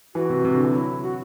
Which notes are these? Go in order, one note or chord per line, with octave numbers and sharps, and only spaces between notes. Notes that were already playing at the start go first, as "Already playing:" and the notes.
E3 F#4
C3
C3
D3
E3
F#3 E4
F#4